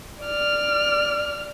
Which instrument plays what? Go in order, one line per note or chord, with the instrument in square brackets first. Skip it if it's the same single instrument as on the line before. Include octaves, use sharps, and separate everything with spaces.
[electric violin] D5 F6